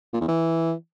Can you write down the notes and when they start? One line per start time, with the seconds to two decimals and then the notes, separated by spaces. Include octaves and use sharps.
0.13 A#2
0.21 E2
0.28 E3